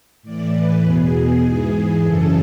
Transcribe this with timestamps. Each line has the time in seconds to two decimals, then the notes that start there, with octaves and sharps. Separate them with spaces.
0.23 A2 E3 D5
0.54 B4
0.83 E2 B2 G#4
1.14 G#4
1.44 G#2 E3
2.04 F#2 C#3 E3 A4